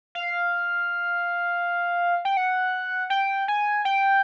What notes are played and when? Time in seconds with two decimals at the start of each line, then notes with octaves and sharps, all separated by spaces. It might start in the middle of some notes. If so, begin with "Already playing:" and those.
0.15 F5
2.25 G5
2.37 F#5
3.10 G5
3.48 G#5
3.85 G5